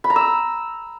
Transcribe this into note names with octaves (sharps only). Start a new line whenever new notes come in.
B5
A#5
E6